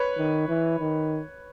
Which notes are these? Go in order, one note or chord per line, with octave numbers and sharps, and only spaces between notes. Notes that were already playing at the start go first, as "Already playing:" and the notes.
Already playing: B4 C#5
D#3
E3
D#3